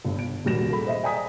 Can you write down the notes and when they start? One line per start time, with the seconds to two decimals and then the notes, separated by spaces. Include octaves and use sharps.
0.05 G1 G2
0.19 D7
0.45 D#1 D#2 G3 F#4 A#6 E7
0.70 G#4 A4 B5
0.87 C5 D#5 E5
1.03 D5 G5 G#5 A#5 D#6 B6